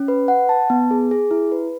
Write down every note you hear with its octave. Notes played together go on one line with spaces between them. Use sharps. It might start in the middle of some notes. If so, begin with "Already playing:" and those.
Already playing: C#4
B4
F#5
A5
B3
G#4
G#4
E4
B4